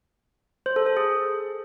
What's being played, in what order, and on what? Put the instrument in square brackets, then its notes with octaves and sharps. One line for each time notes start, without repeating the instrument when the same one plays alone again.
[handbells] C5
A4
A4
G#4